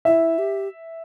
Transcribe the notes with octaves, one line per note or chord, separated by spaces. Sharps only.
E4 E5
G4